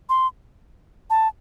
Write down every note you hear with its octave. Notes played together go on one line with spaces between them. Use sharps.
C6
A5